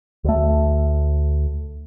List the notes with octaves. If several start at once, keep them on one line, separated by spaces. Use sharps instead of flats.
D2 A3